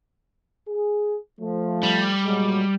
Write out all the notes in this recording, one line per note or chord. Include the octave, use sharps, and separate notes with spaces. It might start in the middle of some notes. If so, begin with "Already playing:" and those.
G#4
F3 A3
G3
A#2 F#3 G#3